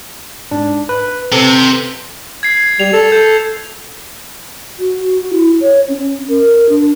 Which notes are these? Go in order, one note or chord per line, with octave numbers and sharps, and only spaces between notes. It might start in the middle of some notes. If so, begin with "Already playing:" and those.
G#2 D4
B4
C3 C4 A4 B4
G#6 C7
G3 F7
A4
A4 G6
F#4
E4
C#5
C#4
A#4
D4